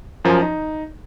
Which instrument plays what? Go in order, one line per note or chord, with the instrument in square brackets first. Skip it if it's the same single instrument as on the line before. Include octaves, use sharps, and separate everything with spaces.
[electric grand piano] F#2 F3 A#4 G#5
D#4